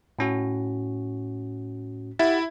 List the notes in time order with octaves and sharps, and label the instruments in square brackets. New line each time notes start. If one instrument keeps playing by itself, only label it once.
[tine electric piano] A2 C#4 F#4
[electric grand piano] E4 E5 [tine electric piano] G4 F#5 A6